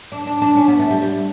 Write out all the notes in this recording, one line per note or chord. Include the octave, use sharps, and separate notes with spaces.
D4
D4
D4
C#4
B3
A3
G3
G3